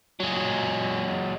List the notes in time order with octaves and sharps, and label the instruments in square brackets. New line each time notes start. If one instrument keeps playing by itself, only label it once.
[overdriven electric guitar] F#3 G#3